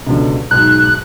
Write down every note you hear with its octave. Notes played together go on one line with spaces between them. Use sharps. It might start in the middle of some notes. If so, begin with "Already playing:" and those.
C#2 B2 D3
B1 G#2 F#6